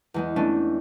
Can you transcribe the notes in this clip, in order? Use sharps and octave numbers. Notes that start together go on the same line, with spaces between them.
E2 G#3 B3
A3 B3 C#4 D4